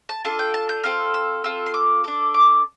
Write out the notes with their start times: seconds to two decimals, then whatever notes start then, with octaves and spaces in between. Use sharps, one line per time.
0.09 A5
0.25 D4 F4 A4 A5
0.39 G5
0.54 A5
0.69 G6
0.84 C4 F4 A4 F6
1.14 E6
1.44 C4 F4 A4 E6
1.66 C6
1.74 D6
2.04 D4 A4 D6
2.34 D6